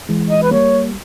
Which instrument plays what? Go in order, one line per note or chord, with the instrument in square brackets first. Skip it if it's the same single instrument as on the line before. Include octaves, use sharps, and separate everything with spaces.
[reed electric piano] E3 G#3
[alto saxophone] D#5
B4
[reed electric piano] G3 A#3 [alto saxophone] C#5